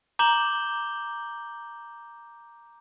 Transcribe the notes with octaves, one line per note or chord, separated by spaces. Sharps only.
A#5 D6 G6 E7 F#7 G7